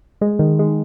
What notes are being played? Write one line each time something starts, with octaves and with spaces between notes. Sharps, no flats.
G#3
D#3
G#3